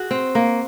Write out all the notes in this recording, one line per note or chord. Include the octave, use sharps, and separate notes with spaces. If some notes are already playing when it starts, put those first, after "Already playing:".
Already playing: F#4 G#4
C4
A#3